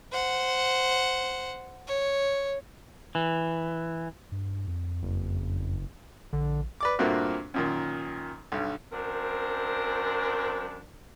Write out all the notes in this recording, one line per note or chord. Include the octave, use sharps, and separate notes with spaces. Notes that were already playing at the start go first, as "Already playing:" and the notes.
C5 F#5
C#5
E3
G2
F2
F#1
A#1 D3
B4 D5 D6
G2 A#2 A3 A#3 C4 F#4
F#2 A#2 D#3
B1 G2
F#2 C4 D4 A#4 C5